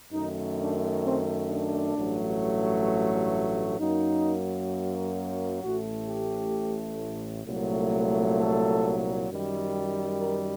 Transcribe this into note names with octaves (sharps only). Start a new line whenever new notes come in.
F#2 D#3 A3 D#4
D4
C4
D4
A1 G2 F#3 A3
F#2 F#3 A#3 D#4
A1 A2 A3 F#4
G4
C2 A#2 F#3 A3
A4
F#2 D#3 G3
A#4